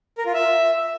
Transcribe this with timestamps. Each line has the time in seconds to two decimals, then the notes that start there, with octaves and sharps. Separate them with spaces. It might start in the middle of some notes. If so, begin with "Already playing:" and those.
0.18 A#4
0.26 F4
0.34 E5